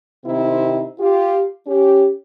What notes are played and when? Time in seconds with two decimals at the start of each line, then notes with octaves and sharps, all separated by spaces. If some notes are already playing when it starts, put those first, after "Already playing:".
0.25 C3 D#3 C4 D#4 E4
1.00 F4 G4
1.67 C#4 G4